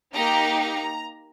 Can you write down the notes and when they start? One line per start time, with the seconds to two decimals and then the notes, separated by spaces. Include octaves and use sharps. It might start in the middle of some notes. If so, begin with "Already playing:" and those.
0.13 A#3 D#4 G4 A#5
0.59 A#5